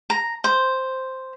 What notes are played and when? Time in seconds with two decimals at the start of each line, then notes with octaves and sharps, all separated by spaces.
0.10 A#5
0.44 C5